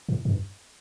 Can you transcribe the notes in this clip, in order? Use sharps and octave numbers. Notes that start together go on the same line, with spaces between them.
G#2
G2